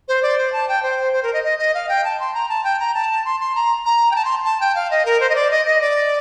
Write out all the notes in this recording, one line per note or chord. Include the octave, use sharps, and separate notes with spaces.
C5
D5
C5
A5
G5
C5
C5
A#4
D#5
D#5
D#5
F5
G5
A5
C6
A#5
A5
G5
A#5
A5
C6
C6
A#5
A#5
G5
A5
C6
A5
G5
F5
D#5
A#4
C5
D#5
D5
D#5
D#5
D5